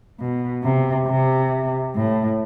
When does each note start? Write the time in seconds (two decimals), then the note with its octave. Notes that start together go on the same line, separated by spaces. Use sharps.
0.20 B2
0.63 C3
1.07 C3
1.95 A2